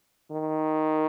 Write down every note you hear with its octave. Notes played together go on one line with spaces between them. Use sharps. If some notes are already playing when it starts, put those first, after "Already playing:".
D#3